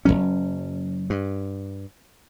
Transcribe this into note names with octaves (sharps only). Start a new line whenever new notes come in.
F#1 D#2 F#3 C#4
G2